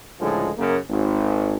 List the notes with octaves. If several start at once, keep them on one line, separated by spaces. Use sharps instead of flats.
C#2 A2 D3 F3 G#3
F#2 C#3 A#3
G#1